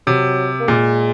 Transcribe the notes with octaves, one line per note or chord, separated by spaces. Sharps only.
C3 F#3
A#3
A#2 G#3